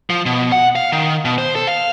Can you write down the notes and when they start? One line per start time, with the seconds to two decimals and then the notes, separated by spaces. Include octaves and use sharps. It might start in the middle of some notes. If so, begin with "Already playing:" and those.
0.10 F3
0.26 B2
0.52 F#5
0.76 F5
0.92 D#3
1.25 B2
1.38 C5
1.55 A4
1.67 F5